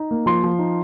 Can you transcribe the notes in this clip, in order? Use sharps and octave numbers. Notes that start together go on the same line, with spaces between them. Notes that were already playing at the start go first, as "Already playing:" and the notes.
Already playing: D#4
A#3
F3 C6
F3
D#4